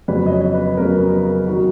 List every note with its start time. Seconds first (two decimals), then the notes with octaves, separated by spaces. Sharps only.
0.08 F2 C#3 F#3 B3 B4
0.26 D#5
0.32 C#5
0.54 B4
0.77 F2 C#3 F#3 B3 A#4
1.12 A#4
1.47 D#3 F#3 F#4